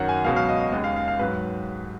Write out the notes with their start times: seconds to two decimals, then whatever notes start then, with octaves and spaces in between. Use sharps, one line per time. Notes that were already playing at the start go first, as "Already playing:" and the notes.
Already playing: F#2 D#3 F#3 F#5
0.09 G#5
0.24 C#2 B2 F#3 F5
0.36 F5
0.49 D#5
0.60 D#5
0.72 D#2 C#3 G#3 D#5
0.84 F5
0.96 F5
1.08 F5
1.19 G#2 F#3 B4